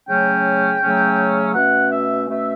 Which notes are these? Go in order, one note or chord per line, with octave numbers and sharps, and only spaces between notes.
C#3 F#3 A3 C#4 G5
C#3 F#3 A3 C#4
B2 A3 C#4 F#5
E5
B2 A3 C#4 E5